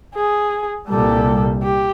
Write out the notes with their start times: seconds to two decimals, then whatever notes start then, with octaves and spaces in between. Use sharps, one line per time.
0.15 G#4
0.90 C2 A#2 G3 A4
1.63 G4